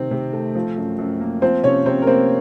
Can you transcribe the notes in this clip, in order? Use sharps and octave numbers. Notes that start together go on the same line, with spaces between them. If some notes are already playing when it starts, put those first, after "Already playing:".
Already playing: C3 D#3 C4
C3
A3
F3
F#2
F#2
A#3
F3 C4 C5
C3 C#4 C#5
C3 C4 C5
A#4
A#3 C4 C5